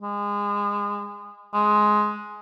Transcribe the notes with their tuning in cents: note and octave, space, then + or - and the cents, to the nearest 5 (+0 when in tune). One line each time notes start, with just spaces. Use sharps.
G#3 -25
G#3 +10